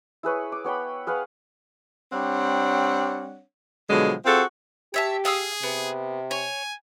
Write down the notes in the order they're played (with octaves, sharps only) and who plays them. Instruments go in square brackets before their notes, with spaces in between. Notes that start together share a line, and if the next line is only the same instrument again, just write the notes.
[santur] E4 G#4 B4 C#5
D6
B3 C#5 G5 B5
G#4 B4 F5 F#5
[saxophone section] G3 C4 D4 C#5 F#5
B2 D3 F3 F#3 G#3
C4 F4 F#4 G#4 A4
[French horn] G4 [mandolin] C#5 E5 A5
[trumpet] G#4 [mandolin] F5 D#6 E6
[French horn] C3 [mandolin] B3
[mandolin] C#5 [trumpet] G#5